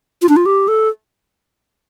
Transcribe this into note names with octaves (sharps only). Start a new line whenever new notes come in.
F4
D4
F4
G4
A4